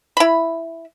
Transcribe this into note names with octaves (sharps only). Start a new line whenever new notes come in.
E4 B5